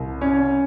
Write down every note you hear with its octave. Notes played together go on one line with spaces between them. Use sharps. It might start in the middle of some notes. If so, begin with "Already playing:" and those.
Already playing: C2
C#4